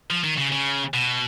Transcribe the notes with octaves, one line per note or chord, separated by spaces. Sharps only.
F3
D#3
C#3
C#3
B2